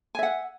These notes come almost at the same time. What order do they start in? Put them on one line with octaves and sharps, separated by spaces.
G#5 E5 F#5